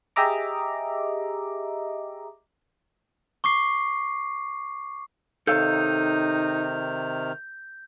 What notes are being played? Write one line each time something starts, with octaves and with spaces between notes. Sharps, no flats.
G4 G#4 D#5 E5 A#5 D6
C#6 D6 C7
C3 D#3 D#4 A4 C#5 F5 F6 G6